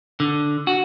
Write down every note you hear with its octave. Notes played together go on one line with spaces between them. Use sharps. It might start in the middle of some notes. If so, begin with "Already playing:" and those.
D3
F#4